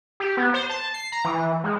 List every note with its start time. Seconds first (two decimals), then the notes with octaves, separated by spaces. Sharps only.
0.20 G4
0.37 B3
0.54 C5
0.70 A5
0.94 C7
1.12 A#5
1.25 E3
1.64 G#3